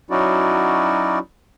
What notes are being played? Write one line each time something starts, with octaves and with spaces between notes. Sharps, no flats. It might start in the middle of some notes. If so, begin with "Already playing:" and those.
F#3 C#4 D#4 E4 F#4 D5